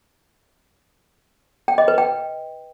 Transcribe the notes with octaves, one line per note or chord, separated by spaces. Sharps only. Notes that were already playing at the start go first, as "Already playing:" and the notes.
G5
D#5
B4
G5